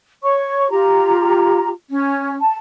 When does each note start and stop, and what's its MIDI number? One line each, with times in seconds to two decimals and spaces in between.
0.22 0.70 73
0.22 0.70 85
0.71 1.69 65
0.71 1.69 67
0.71 1.69 82
1.89 2.36 61
2.40 2.57 81